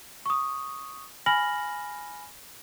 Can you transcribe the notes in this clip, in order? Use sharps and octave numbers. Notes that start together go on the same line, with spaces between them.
C#6 D#6
G#5 B5 F6 A#6 F#7